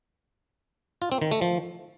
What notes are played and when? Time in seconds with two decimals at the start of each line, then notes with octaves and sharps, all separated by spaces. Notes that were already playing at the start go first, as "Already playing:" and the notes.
1.02 F4
1.12 C4
1.22 D#3
1.31 A3
1.41 F3